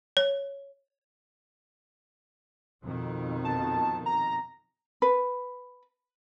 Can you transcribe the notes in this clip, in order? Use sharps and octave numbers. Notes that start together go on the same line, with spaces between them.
C#5
F2 B2 D#3
A5
A#5
B4